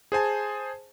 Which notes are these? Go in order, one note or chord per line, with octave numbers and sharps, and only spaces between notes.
G#4 C5 G#5 A5